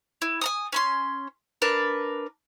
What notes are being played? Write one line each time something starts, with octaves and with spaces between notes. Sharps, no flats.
E4
G#5 A#5 D#6
C#4 B5 C6
D4 A#4 B4